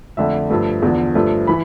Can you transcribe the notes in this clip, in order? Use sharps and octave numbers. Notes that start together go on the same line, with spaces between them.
F2 D3 A3 E5
G2 F3 A3
E2 D3 F3
G2 F3 A3
E3 B5